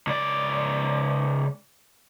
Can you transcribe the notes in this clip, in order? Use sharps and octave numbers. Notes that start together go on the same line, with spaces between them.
C#2 D5